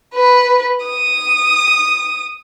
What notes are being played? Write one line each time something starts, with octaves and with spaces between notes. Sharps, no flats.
B4
D#6